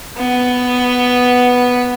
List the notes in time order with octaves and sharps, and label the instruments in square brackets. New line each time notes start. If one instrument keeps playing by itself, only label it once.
[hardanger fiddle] B3